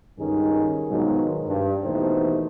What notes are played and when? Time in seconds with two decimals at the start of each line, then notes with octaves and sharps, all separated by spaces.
0.18 C#2 G2 D#3 C#4 D#4 G#4
0.89 G#2 B2 D#3 F3 F#3 G#3
1.47 G2
1.84 D#2 B2 E3 A3 D#4 C5